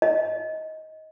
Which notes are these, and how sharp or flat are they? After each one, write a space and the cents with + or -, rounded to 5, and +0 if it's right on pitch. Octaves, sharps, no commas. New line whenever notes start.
D#5 +15